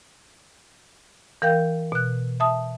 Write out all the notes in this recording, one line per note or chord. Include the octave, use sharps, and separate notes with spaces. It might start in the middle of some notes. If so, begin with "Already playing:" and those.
E3 A#4 F5 G5 G6
B2 F#6
E5 A5 D#6